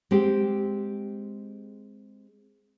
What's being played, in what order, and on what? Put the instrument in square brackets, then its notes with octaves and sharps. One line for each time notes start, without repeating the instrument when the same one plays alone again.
[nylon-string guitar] G#3 C4 G4